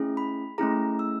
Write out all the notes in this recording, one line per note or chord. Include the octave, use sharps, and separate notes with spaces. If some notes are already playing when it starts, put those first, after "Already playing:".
Already playing: A3 C#4 E4 G#4
B5
A3 C#4 E4 G#4 A#5
E6